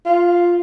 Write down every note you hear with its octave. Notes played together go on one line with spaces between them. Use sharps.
F4